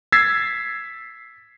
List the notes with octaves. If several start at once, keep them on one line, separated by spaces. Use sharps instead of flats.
E6 G#6 A6 B6 C7